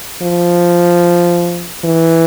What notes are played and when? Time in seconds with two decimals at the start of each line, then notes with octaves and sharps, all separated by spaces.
0.23 F3
1.84 E3